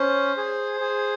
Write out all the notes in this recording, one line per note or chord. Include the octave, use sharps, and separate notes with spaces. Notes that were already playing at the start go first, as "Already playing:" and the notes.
Already playing: C#4 C5
G#4
G#4